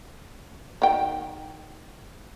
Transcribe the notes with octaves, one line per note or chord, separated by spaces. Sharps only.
D#3 F#4 G5